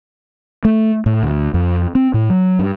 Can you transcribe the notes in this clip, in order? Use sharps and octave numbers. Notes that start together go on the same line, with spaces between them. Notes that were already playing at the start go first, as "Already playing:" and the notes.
A3
A2
D2
F2
C4
A2
F#3
G2